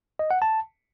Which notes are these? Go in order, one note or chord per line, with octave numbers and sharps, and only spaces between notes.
D#5
F#5
A5